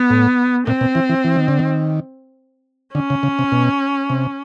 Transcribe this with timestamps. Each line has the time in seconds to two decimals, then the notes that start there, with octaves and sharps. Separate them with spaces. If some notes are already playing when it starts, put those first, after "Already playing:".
Already playing: B3
0.10 A2
0.66 A#2 C4
0.81 B2
0.95 E3
1.09 E3
1.24 E3
1.36 D#3
1.48 D3
1.59 D#3
2.95 D3 C#4
3.10 C#3
3.23 C#3
3.39 C3
3.52 B2
4.10 C3